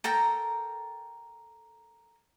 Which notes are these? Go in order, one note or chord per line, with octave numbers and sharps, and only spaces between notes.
A4 A#4 G5 A#5